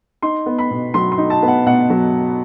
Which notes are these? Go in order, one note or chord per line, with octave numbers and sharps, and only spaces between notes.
D#4 C6
B3
B5
B2
F#3 C6
C6
D#4
A5
B3
F#5
B2 F#5
F#3